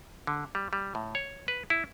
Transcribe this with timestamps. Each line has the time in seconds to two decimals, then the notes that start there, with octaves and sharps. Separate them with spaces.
0.27 D3
0.55 G3
0.73 G3
0.95 A2
1.15 C#5
1.48 B4
1.70 E4